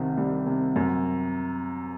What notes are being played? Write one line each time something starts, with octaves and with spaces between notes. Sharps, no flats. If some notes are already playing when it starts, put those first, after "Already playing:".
Already playing: C2 C3 D#3
G3
C3
F#2